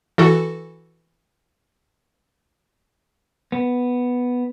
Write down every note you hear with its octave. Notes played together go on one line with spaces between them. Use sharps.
E3 F#4 A4
B3